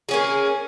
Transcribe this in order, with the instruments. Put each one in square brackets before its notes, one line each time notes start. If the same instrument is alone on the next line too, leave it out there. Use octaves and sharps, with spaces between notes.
[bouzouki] A#3 C#4 G#4